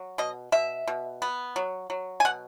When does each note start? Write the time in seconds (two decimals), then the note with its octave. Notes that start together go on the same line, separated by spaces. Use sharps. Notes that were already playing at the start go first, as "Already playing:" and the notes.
Already playing: F#3
0.18 B2 D#5
0.52 B2 E5
0.87 B2
1.22 B3
1.56 F#3
1.90 F#3
2.20 G#5
2.25 B2 F#5